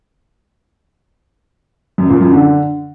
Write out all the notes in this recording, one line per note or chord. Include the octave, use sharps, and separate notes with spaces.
F#2
A#2
F#2
D3